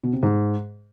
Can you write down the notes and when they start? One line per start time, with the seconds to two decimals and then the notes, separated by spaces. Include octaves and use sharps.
0.03 B2
0.13 C3
0.23 G#2